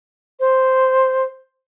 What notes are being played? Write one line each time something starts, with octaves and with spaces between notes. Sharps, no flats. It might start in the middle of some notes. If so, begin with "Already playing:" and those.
C5